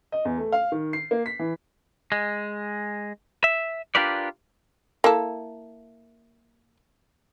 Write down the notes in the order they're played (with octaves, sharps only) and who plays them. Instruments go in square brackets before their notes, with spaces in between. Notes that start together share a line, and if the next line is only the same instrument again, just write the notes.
[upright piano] D#5
E2
A3
F5
D#3
C7
A#3
B6
E3
[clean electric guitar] G#3
E5
D4 F4 G4 A#4 B4 D5
[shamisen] A#3 E4 A4